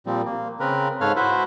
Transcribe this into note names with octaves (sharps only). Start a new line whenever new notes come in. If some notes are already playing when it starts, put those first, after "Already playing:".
A#2 F3 G3 C4
A#3
C#3 C4 A#4 B4
G#2 A4 B4 C#5 F5 F6
E4 F#4 B4 C5 E5